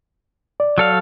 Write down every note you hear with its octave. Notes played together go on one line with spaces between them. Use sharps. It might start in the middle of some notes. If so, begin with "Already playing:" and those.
D5
F#3 A4 F5